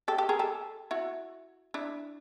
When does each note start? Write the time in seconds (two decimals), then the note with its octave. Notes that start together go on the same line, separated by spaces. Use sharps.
0.08 G4 A4
0.18 G4 A4
0.29 G#4 A#4
0.39 G4 A4
0.91 E4 F#4
1.74 D4 E4